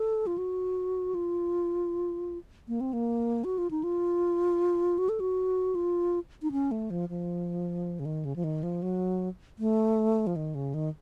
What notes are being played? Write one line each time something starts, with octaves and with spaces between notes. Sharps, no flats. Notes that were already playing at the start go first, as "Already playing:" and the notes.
Already playing: A4
F4
F#4
F4
A#3
C4
A#3
F#4
F4
D#4
F4
F#4
A4
F#4
F4
D#4
C#4
A3
F3
F3
C#3
D#3
C#3
F3
D#3
F3
F#3
A3
F3
D#3
C#3
D#3